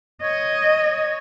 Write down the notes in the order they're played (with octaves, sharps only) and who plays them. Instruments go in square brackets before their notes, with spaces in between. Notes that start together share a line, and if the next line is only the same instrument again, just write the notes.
[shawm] C#5 [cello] D#5
[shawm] C#5